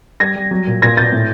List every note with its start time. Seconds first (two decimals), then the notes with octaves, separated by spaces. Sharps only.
0.20 G3 G#6 A#6
0.36 G3
0.51 F#3
0.67 A#2
0.82 A#2 G#6 A#6
0.97 A#2 G6 A6
1.12 A2